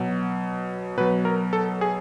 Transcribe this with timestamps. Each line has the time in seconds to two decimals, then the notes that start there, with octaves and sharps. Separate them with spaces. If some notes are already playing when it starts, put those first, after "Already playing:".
Already playing: B2 F#3
0.97 B2 F#3 B4
1.25 A#4
1.53 A4
1.81 G#4